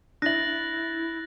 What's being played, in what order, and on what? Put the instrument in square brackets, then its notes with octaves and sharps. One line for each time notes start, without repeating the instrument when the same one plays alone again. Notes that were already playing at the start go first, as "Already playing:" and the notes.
[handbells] D4 E5 [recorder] E4 [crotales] F#6 A6 [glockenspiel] A#6 F#7